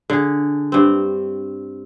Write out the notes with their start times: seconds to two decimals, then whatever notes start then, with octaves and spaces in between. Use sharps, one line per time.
0.10 D3 G#4
0.72 G2 C4